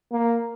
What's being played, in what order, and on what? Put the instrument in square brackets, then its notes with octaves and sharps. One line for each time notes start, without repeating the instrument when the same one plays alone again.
[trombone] A#3